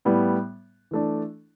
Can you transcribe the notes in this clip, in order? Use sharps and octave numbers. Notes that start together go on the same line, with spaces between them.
A2 G3 B3
E3 A3 D4